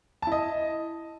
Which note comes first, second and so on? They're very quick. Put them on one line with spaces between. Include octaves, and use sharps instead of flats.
A5 E4 D#5